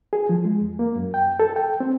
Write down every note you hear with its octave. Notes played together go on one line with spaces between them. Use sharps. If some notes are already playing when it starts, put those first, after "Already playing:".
G#4
F3
G#3
E2
A#3
F#2
G5
A4
G5
C4